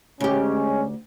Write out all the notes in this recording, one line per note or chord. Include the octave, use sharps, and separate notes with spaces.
D2 G#3 C#4 G4